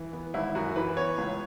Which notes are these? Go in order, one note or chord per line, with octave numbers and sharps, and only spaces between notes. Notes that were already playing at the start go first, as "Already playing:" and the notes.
Already playing: E3
B3
G#1 E4
F#2 F#4
E3 B4
B3 C#5
C#2